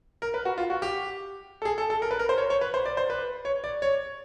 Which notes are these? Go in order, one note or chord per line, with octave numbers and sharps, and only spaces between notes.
A#4
B4
F#4
F4
F#4
G4
A4
G#4
A4
A4
A#4
B4
A#4
C5
C#5
C#5
B4
C5
D5
C5
B4
C#5
D5
C#5